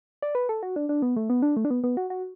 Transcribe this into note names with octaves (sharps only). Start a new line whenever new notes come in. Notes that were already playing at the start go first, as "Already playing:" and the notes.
D5
B4
A4
F#4
D4
D4
B3
A3
B3
D4
A3
D4
B3
B3
F#4
F#4